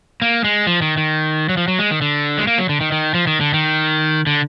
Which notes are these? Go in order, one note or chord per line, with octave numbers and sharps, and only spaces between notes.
A#3
G#3
F3
D#3
D#3
F#3
F3
F#3
G#3
D#3
D3
G#3
A#3
F#3
D3
D#3
D#3
F3
D#3
D3
D#3
D3